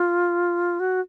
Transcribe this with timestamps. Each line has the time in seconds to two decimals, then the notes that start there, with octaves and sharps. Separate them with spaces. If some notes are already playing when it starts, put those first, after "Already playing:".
Already playing: F4
0.80 F#4